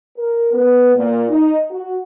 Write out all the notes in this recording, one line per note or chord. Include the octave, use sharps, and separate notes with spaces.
A#4
B3
A#2
D#4
F#4